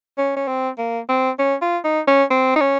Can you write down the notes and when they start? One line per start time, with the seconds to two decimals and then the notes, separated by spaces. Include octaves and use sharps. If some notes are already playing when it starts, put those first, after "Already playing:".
0.18 C#4
0.36 C#4
0.48 C4
0.78 A#3
1.09 C4
1.39 C#4
1.62 F4
1.84 D#4
2.07 C#4
2.30 C4
2.56 D#4
2.61 C#4